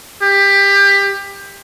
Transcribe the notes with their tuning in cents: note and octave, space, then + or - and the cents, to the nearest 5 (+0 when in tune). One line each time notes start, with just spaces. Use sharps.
G4 +20